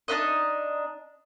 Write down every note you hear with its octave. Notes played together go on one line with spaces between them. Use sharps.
D4 D#4 B4 D#5